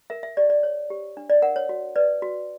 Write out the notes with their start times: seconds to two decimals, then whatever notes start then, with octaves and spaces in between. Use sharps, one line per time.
0.10 A#4 E5
0.23 E5
0.37 G4 D5
0.50 D5
0.63 C#5
0.90 G4
1.17 D4
1.30 D5
1.42 A#4 F#5
1.56 C#5
1.69 F#4
1.96 B4 D5
2.22 F#4